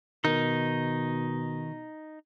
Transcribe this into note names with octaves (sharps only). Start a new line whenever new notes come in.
B2 D#3 D#4